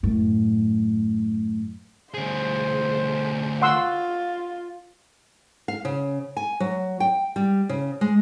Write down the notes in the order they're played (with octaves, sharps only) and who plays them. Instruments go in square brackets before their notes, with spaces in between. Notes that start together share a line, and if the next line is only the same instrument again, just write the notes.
[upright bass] F#2 A2
[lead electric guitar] D2 G#4 [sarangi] C5
[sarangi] F4 [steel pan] F#5 C6 E6
[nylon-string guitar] F5
C#3
G#5
F#3
G5
G3
C#3
G#3